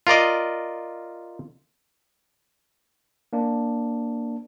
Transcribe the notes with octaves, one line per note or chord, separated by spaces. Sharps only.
F4 A#4 D5 D#5
A#3 D4